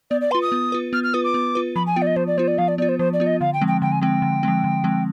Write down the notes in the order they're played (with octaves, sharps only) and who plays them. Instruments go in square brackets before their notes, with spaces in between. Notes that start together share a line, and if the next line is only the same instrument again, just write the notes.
[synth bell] B3 [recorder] D5
[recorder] D5
[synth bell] B4 [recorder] C6
[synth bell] F4
[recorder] D#6
[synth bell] B3
F4 B4
[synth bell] B3 [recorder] F6
[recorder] F6
[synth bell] F4 B4 [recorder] D#6
[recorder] D6
[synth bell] B3
F4 B4
[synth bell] F3 [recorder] B5
[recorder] G#5
[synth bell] B3 F4 [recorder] G5
[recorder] D5
D#5
[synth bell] F3 [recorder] C5
[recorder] D5
[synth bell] B3 F4 [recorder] C5
[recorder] D5
[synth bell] F3 [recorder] F5
[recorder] D5
[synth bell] B3 [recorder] D5
[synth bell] F4
[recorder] C5
[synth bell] F3 [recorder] C5
[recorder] D5
[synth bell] B3 F4
[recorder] D#5
[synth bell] D3 [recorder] F5
[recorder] G5
[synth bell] F3 G#3 C4
[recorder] G5
[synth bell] D3 [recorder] G5
[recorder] G#5
[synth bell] F3 G#3 C4 [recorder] G5
[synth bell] D3
F3 G#3 C4
D3
F3 G#3 C4